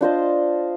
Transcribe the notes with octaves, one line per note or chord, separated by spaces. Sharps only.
D4 F4 C5 D#5